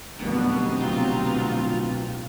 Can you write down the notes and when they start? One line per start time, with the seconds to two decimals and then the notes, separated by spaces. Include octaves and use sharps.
0.20 D1 F2 B2 G3 B3 C4 D#4 G4
0.81 C2 B2 F#3 F4